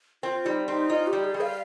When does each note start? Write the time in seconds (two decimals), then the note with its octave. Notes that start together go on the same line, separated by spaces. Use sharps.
0.23 C4 F4
0.45 G3 D#4
0.68 C4 D#4
0.90 D#4 F4
1.07 G4
1.13 G3
1.24 G#4
1.34 G3
1.41 F5